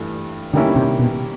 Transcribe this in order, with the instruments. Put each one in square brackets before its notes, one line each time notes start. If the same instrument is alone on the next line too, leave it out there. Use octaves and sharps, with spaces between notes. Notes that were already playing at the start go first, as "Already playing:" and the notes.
Already playing: [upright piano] G2 E3 A3 D4
[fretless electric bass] D3 [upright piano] D#3 G3 A#3 C#4 E4
[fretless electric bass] C3
B2